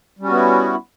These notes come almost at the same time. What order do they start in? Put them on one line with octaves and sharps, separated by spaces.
G3 C#4 F#4 B3 E4